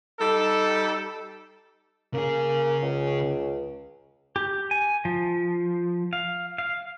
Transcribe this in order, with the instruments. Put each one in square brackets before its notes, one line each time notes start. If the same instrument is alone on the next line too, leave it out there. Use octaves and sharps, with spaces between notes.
[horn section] G3 D#4 A4
[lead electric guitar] C#3 G#4 [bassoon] A#3
[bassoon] C#2
[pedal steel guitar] G4
G#5
F3
F5
F5